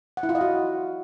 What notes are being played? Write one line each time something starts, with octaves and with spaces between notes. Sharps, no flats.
F#5
E4
F4
D#5
F#4